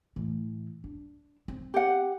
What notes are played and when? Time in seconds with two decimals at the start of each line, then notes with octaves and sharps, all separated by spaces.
0.16 A2 E3
0.84 D4
1.48 C4
1.74 G4 F#5